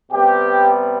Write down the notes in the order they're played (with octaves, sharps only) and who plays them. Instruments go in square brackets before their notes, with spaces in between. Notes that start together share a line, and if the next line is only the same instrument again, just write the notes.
[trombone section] C3 G3 B3 G4